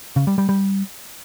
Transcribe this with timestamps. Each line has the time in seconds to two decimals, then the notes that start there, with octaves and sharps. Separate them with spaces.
0.16 C#3
0.27 G3
0.38 G3
0.49 G3